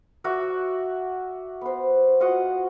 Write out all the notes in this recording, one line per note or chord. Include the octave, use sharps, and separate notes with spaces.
F#4 A#4 D5 E5
B3 C5
F4 F#4 D#5 F#5